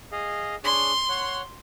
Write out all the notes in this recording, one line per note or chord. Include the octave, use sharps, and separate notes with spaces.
G#4 D#5 F5
D4 G#4 C#5 C6
C#5 F#5